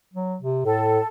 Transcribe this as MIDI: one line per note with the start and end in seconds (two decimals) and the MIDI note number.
0.14 0.36 54
0.42 0.64 48
0.66 0.99 45
0.66 1.06 69